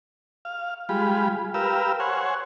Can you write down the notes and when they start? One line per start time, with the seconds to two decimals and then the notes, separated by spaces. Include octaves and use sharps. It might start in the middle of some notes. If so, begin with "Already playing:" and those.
0.45 F5
0.89 G3 G#3 F4 B5
1.54 G4 A#4 B4 F5 E6
2.00 C5 C#5 F#5 G#5